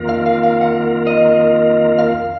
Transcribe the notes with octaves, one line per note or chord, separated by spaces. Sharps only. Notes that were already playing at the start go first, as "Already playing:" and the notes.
Already playing: F2 D#3 A#3 F4 A#4
F5
F5
F5
F#5
D#5
F5